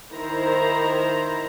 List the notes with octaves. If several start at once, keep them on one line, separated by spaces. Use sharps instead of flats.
D#3 E4 C5 A#5